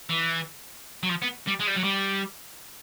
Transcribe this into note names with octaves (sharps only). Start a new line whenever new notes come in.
E3
F#3
F3
B3
G3
G#3
G3
F#3
G3